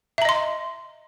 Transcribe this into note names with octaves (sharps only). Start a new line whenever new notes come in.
D#5 E5 A#5 C6